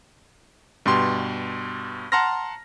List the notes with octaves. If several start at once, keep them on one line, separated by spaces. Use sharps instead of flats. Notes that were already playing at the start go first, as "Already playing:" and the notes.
G2 B2 G4 C6
F#5 A5 A#5 C6 F6 A#6